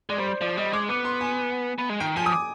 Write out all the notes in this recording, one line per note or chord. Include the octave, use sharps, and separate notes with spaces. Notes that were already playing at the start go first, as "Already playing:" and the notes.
G#3 D5
G3 C5
D5
F3 D5
G3 D#5
G#3 D6
B3 D6
C6
G#5
B3
G#3
D#3 G5
F3 G#5
D#6
D6